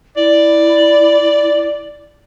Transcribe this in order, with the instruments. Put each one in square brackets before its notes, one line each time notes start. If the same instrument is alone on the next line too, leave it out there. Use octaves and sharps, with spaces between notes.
[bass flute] E4 [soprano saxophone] D5